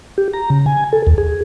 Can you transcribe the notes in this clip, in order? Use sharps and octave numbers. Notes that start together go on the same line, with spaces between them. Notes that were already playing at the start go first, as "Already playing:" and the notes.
G4
A#5
C#3
G#5
A4
D#2
G#4